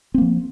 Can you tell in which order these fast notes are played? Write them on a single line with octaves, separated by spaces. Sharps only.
C4 A#3 F3